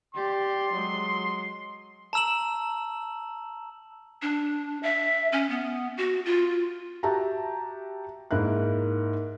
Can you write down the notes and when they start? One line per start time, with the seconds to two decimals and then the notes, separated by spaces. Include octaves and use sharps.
0.15 G4 D5 C6
0.72 F#3 G#3
2.13 A5 A#5 E6 E7 F#7
4.22 D4
4.83 E5
5.32 C#4
5.50 B3
5.97 F#4
6.26 F4
7.03 F#4 G4 E5 A5 A#5
8.31 G#2 A#3 E4 A#4 F#6